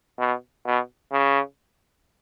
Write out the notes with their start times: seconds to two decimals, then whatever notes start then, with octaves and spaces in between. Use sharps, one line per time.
0.19 B2
0.65 B2
1.12 C#3